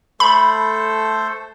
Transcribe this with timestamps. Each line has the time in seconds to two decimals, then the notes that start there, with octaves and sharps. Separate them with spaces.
0.20 A3 A4 C5 B5